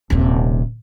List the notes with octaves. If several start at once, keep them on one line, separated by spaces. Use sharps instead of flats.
D#1 C3